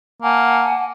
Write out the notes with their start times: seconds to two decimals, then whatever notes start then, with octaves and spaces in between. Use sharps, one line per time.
0.22 A#3 F#5 G#5 A5